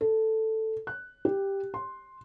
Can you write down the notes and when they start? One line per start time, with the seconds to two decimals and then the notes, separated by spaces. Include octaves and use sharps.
0.01 A4
0.87 F#6
1.25 G4
1.74 C6